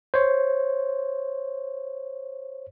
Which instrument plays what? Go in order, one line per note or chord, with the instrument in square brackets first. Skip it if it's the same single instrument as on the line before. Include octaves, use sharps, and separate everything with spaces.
[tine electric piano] C5 C#5